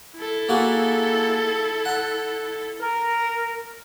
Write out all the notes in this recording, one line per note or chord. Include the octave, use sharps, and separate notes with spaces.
E4 A4
A#3 F#4 G#4
F#5 B5
A#4